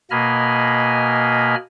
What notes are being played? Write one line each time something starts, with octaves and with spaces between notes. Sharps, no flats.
B2 A#3 D#5 G#5 B5 F6